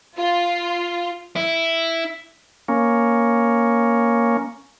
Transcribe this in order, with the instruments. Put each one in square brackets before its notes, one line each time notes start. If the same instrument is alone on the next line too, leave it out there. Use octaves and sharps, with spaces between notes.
[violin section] F4
[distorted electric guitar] E4
[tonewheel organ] A#3 C#4